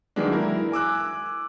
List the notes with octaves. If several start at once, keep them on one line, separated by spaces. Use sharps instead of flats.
D#3 E3 F#3 G#3 A#3 D4
E4 A#4
G#5 D6 E6 F#6